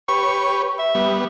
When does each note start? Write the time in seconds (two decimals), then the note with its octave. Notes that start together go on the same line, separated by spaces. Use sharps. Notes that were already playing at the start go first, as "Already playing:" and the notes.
0.08 G4 B4 C#5 C#6
0.79 E5
0.95 G3 B3